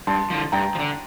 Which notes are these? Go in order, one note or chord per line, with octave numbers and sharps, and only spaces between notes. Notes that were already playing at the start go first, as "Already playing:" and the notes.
G2 A5 C6
D3 F3
G2 G5 A#5
F3
D3